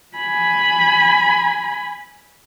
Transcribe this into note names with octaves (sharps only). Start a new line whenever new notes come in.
G#5 B5